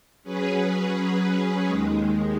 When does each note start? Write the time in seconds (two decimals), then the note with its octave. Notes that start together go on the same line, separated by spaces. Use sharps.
0.23 F#3 C#4 G#4 B4
1.66 D#2 D#3 G#3